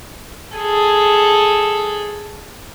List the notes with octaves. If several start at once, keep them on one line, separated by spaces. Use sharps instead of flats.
G#4 A4